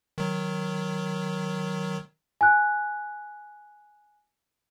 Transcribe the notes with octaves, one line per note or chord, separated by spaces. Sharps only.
D#3 F#3
G#5 F#6